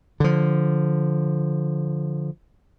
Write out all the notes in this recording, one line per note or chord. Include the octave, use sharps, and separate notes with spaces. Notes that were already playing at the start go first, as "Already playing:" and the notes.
D3 F3